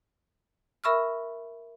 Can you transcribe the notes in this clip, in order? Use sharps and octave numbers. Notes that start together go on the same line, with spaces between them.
A#4 E5 B5 C#6 E6 F6